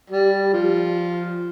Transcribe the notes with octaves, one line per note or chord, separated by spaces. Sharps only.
G3
F3